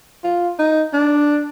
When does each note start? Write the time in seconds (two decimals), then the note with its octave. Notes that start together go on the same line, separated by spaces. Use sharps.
0.24 F4
0.59 D#4
0.93 D4